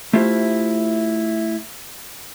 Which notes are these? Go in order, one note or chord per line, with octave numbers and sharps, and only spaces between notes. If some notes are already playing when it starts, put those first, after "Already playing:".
A3 E4 F4 G4 C5